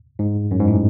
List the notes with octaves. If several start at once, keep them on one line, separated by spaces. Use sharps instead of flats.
G#2
F#2
G#2
A2